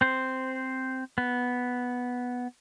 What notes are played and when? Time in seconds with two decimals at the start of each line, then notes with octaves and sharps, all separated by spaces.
0.01 C4 C5
1.18 B3